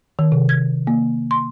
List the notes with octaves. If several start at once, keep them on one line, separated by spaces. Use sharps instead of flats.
D#3
C3
G#6
A#3
C6